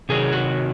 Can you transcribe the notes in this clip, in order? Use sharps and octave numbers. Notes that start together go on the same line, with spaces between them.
C3 D#3 F#3 G#4
F#4